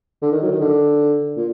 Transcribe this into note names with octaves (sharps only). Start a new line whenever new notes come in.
D3
D#3
F#3
D#3
D3
A#2